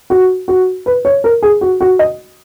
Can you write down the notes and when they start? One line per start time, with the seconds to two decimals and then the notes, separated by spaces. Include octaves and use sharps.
0.10 F#4
0.48 F#4
0.86 B4
1.05 C#5
1.24 A#4
1.43 G#4
1.61 F#4
1.81 F#4
1.99 D#5